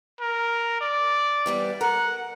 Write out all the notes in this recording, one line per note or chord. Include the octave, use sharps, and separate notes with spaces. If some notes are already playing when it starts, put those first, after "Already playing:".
A#4
D5
E3 G3 B3
A#4 F#5